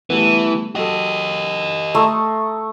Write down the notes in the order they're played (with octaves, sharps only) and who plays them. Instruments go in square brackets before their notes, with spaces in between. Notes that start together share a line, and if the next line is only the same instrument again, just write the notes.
[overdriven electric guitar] E3 [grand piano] G3 A3 B3
[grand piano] F#3 A4 [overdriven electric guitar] G4 D#5
[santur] A3 [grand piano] A#5 C6 D#6